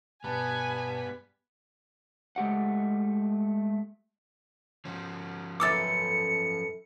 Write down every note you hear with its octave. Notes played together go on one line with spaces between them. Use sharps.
G2 B2 B3 G#5 A5 B5
G#3 A3 G4 F#5
F3 C#4
F#2 A4 B4 D6 E6 A6 C#7